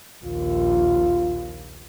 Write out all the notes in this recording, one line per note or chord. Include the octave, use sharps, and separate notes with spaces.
A#1 D#2 F4